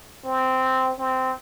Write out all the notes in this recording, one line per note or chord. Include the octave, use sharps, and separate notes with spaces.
C4
C4